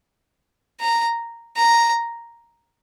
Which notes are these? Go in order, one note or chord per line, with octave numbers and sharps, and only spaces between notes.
A#5
A#5